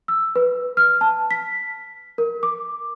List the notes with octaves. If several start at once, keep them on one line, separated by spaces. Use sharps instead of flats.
E6
B4
F6
A5
B6
A#4
D6